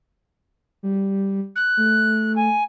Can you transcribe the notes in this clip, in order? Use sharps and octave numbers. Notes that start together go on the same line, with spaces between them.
G3
F#6
A3
G#5